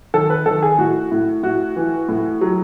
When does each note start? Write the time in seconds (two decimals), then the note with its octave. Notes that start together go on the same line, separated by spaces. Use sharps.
0.14 D#3 A4
0.30 B4
0.46 D#3 A4
0.62 G#4
0.78 A2 F#4
1.12 A2
1.43 A2 F#4
1.76 E3
2.09 A2
2.41 F#3